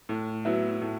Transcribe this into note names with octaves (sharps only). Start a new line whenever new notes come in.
A2
F#3 B3 E4
A2